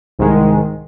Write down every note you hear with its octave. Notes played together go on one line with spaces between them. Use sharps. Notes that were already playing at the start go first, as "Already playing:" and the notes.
C2 G#2 D#3 G#3